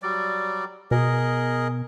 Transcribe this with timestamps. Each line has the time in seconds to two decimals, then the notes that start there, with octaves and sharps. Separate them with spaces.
0.02 F#3 G3 D5
0.91 B2 G#4 A#4 D#5